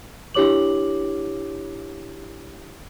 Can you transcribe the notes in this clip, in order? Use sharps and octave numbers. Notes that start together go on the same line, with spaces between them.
D4 E4 G4 C#5 D6 F#7